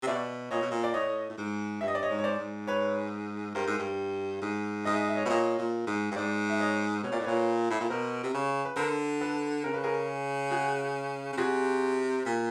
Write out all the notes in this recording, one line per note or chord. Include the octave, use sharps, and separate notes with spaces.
C3
B2 D5 E5
A#2 C#5 D#5
B2
A#2
D5
A2 C#5 D#5
A2
G#2
G2 E5
D#5
D5
C#5 D#5
G#2
C#5
C5 D5
G#2
B4 C#5
G2 A#4 C5
G#2
G2
G#2
G#2 D#5
E5
D#5
E5
C#5 D#5
B2
A#2 C#5 D#5
A#2
G#2
G2
G#2 C5 D5
E5
C#5 D#5
B2 C#5
A#2 D5
A2
A#2 B4 C#5
A2
A#2
B2 A#4 C5
C3
C#3
B4
D3 A#4 C5
A4 B4
C#3 A#4
B4
G#4 A#4
F#4 G#4
C#3
C3 F#4 G#4
A#2